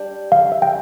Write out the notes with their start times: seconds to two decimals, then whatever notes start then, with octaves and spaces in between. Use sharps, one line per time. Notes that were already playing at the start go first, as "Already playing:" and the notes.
Already playing: G3 D4
0.32 F5
0.52 E5
0.62 G5